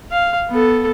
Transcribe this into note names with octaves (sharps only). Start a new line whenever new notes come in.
F5
B3 A4